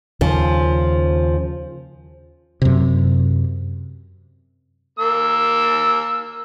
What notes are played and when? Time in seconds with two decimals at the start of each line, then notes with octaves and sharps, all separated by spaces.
0.21 D#2 C#3 F3
2.62 F#2 C3
4.99 A#3 E6